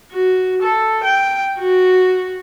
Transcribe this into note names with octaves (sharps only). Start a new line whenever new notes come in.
F#4
A4
G5
F#4